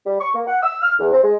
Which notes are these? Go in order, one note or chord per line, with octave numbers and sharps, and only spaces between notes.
G3
C#6
A#3
F#5
E6
F6
E2
C4
G#3